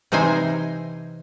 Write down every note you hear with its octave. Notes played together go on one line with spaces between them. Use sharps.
C3 E3 D#4 C5 G#5